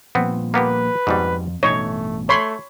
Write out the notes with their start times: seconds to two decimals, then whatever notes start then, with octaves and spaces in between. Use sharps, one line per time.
0.15 A#2 F3 G3 B3 C4
0.54 A#3 B3 G4 B4
1.07 F2 G#2 B2 G3
1.63 A1 G2 B2 A3 D#4 C#5
2.29 A3 C#5 B5 C6